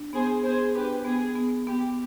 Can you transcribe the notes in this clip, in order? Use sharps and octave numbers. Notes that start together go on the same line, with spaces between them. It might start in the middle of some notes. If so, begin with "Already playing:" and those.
Already playing: D4
B3 G#4 C5
B3 G#4 C5
D4 G4 B4
B3 G#4
B3
B3 G4